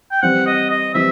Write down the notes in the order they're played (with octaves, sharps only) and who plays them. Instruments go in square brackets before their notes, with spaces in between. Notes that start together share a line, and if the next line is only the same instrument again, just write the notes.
[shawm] G5
[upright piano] E3 G3 C4 [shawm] F#5
[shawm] D#5
D#5
[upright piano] E3 G3 C4 [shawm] E5